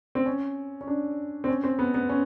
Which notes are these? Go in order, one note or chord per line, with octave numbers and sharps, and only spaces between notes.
C4
C#4
C#4
D4
C4
C#4
C4
B3
B3
C#4